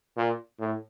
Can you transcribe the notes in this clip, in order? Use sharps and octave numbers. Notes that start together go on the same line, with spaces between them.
A#2
A2